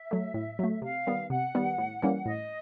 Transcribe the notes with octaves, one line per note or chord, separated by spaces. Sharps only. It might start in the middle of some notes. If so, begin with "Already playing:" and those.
Already playing: E5
F#3 A3
A2
F#3 A3
C3 F5
D#3 G3 B3
C3 F#5
D#3 G3 B3
A2
E3 G3 A#3 C#4
A2 D#5